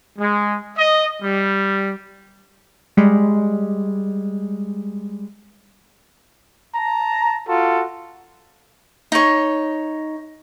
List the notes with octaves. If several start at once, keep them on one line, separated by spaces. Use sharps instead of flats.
G#3
D#5
G3
G3 G#3
A5 A#5
F4 F#4 A4
D#4 C#5